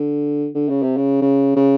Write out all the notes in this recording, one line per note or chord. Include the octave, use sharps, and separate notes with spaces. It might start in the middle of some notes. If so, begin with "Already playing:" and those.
Already playing: D3
D3
C#3
C3
C#3
C#3
C#3